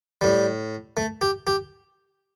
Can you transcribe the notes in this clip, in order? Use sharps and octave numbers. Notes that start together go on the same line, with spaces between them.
A2 G3
A3
G4
G4